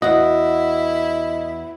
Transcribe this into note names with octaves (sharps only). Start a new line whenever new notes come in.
E2 E4 F#4 D#5